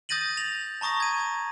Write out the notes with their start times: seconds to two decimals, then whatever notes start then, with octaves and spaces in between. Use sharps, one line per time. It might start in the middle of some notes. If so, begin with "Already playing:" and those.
0.09 D#6 G6 A6 A#6 D#7 F#7
0.37 A6 A#6 F7 F#7
0.81 A5 A#5 C#6 D#6 A#6
1.00 G#6 D#7